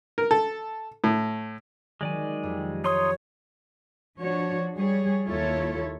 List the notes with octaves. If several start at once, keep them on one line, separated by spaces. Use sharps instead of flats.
A#4
A4
A2
D#3 F#3 G#3 D5 G#5
F2 G4
D#4 C#5 C6 D#6
F3 D4 F#4 C#5
G3 G#4 C#5
D#2 A#3 E4 F4 A4 C#5